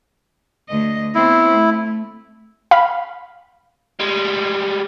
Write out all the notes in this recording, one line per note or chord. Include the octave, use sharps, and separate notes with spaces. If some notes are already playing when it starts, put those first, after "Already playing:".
D2 D#5
B3 C4 E4
A3
F5 B5
G3 G#3